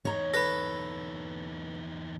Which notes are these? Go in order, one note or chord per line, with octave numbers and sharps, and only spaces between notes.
E2 D#4 C#5 A#5
A4 B4 B5 A#6